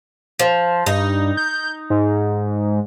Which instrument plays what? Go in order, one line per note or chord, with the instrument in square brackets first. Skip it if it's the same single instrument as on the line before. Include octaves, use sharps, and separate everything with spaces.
[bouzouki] F3
[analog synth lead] G2 [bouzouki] D#4
[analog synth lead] G6
G#2